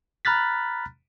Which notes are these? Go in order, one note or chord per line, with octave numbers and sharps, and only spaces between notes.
A#5 B5 F6 F#6 A6 B6